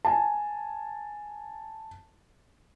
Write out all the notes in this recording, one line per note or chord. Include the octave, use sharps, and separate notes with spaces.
G#5 A5